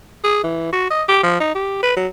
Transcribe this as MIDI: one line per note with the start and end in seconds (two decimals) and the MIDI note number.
0.24 0.40 68
0.43 0.68 52
0.73 0.88 66
0.90 1.03 75
1.08 1.22 67
1.24 1.39 53
1.40 1.54 63
1.55 1.81 67
1.83 1.95 71
1.97 2.07 54